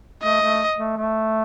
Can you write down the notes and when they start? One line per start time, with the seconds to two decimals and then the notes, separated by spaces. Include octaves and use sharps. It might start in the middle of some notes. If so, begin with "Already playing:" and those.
0.23 A3 D#5
0.42 A3
0.78 A3
0.97 A3